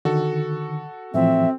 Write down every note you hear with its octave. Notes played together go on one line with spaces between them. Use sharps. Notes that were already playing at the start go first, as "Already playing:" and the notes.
D3 D#3 F#4 A4
A2 E3 F3 C4 E5